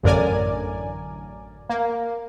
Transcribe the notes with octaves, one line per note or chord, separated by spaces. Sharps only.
A1 F#2 D3 A#4 D5 G#5
A#3